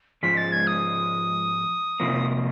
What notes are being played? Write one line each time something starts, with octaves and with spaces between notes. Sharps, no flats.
G#2 F3 G#3 B6
A6
G#6
D#6
F2 C3 F3 A#3